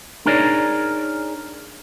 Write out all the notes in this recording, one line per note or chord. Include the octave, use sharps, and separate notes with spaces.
D4 D#4 G#4 A#4 C#5 D5